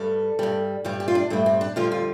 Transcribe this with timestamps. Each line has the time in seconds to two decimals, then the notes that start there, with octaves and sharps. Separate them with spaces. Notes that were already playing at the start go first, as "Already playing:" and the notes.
Already playing: G2 G3 A4
0.39 G2 G3
0.85 G2 G3 G4
1.00 G4
1.08 F4
1.15 D4
1.30 G2 G3 A3
1.46 C4
1.61 D4
1.76 F2 D3 G3 F4
1.92 F4